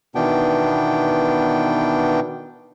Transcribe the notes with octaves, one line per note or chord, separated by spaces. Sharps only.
B2 D#3 E3 B3 D4 G5